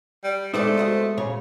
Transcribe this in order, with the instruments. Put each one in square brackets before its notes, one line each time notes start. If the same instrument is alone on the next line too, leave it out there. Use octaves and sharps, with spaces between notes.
[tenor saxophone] G3
[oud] G#3 B3 [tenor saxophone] A3 [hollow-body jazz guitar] D#4 C5 D5
[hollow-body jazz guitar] F#4 C5 D#5
A#2 C#3 C#5